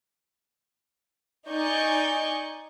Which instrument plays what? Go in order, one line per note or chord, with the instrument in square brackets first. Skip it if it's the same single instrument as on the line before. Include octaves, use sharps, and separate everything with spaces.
[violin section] D#4 D5 D#5 G#5 C#6 G6